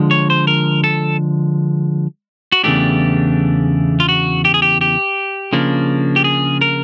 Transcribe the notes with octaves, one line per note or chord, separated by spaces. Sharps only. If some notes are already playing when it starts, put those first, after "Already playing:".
Already playing: D3 F3 G#3
C#5
C5
A#4
A4
F#4
E2 C#3 E3 A3 D4 G4
F4
F#4
G4
G#4
G4
G4
C#3 F3 A#3 D4
G4
G#4
A#4